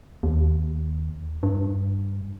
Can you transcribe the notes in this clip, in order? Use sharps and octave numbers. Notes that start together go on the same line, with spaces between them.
D#2
G2